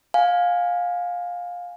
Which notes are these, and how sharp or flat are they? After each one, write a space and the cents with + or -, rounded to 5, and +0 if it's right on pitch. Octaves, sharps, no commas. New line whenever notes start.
F5 +20 G#5 +0